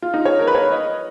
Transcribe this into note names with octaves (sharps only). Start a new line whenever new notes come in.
F4
D#4
C#5
A#4
B4
C#5
D#5